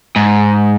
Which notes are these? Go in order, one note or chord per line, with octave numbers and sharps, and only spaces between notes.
G#2